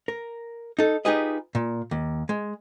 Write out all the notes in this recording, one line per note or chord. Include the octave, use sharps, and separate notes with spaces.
A#4
D#4 A4
D#4 F4 G4 G#4 B4 D#5
A#2
D#2
G#3